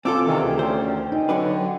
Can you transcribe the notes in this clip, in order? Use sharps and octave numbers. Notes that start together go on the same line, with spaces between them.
C4 F4 A4 G#5 D6 E6
C3 D#3 E3 D4 A5 B5
D2 G4 G#4
C#4 C5 D5 G5
D#4 G5 G#5
D3 F#3 D4 B4